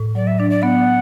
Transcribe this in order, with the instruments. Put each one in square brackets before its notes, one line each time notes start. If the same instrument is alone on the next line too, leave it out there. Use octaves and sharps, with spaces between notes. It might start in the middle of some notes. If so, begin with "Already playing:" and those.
Already playing: [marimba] A2
[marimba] F#3 [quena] D5
[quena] E5
[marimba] D4 [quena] D5
[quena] D5
[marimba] B3 [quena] F#5